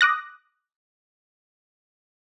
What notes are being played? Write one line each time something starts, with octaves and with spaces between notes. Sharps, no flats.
D6 D#6 F#6 A#6